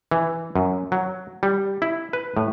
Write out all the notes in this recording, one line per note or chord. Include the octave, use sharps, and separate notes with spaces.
E3
F#2
F#3
G3
E4
B4
A2